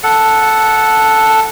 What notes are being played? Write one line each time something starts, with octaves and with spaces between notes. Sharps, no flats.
A4 F#5